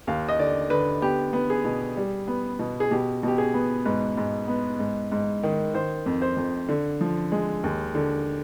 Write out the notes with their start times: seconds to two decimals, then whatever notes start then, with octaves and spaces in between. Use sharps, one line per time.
0.07 D#2 F5
0.29 D#5
0.39 D3 D5
0.70 D3 B4
1.02 B3 G4
1.33 B3
1.50 G#4
1.65 B2
1.97 G3
2.28 B3
2.59 B2
2.80 G#4
2.91 B2 G4
3.23 B2 G4
3.38 G#4
3.54 B3
3.85 G#2 B4
4.17 G#2
4.48 B3
4.79 G#2
5.12 G#2
5.43 D#3
5.74 D#3 C5
6.06 F2
6.22 C5
6.37 F2
6.69 D3
7.01 F3
7.32 G#3
7.64 D#2
7.95 D3